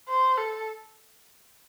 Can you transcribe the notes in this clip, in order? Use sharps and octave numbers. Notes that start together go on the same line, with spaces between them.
C5
A4